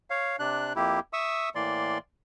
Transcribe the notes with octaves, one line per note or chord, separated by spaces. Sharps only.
C#5 F5
C3 D4 F#6
F2 A#3 E4 G4
E5 C#6 D#6 E6
A2 E3 A#3 D5 C6